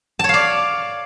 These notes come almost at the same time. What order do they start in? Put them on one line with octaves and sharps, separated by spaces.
A5 C#5 F5 D5